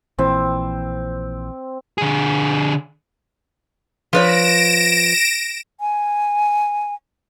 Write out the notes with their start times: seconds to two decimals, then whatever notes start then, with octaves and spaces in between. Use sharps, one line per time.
0.19 A#1 A#2 E3 C4
1.98 D3 G#4
4.13 F3 B4 C#5 A#6 D7 E7
5.80 G#5